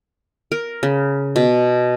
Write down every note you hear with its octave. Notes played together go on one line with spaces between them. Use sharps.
A#4
C#3
B2